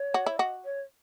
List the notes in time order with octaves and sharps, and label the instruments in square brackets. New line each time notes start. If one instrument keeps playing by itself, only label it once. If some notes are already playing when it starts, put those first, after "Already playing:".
Already playing: [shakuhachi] C#5
[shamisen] F#4
E4
[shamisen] F#4 [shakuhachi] D#5
[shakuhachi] C#5